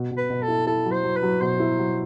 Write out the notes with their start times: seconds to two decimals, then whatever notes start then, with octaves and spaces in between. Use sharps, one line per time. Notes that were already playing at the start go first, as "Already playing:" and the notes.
Already playing: B2
0.11 B2
0.17 B4
0.30 B2
0.42 A4
0.48 E4
0.67 E4 A4
0.86 F#3
0.92 C5
1.04 F#3
1.17 B4
1.23 F#3
1.41 B2 C5
1.60 E4
1.79 F#3